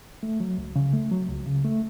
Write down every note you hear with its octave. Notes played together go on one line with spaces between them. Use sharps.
A3
F#3
C#2
C#3
A3
F#3
C#2
C#3
A3